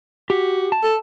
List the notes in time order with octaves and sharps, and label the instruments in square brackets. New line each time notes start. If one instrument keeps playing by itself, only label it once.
[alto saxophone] F#4 [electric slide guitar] G4
[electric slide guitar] A5
[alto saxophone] A4